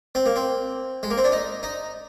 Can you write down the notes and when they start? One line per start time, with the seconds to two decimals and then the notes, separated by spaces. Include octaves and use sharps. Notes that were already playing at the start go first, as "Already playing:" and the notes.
0.15 C4
0.26 A#3
0.36 C4
1.03 G#3
1.10 A#3
1.18 C4
1.24 D4
1.32 D#4
1.63 D#4